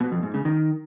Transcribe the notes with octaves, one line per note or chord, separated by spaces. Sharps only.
B2
F2
G#2
C#3
D#3